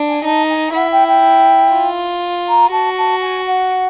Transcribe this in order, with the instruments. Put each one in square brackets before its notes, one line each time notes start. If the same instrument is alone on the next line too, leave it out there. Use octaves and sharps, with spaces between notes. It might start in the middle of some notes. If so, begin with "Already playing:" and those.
Already playing: [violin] D4
[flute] G#5
[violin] D#4 [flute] A5
[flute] G#5
[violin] E4 [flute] F#5
[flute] G5
G5
[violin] F4
[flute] A#5
[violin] F#4 [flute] A5
[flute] A5
G#5
F#5